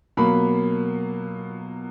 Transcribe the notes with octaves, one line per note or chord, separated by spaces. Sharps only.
B2 F#3 A#3 B5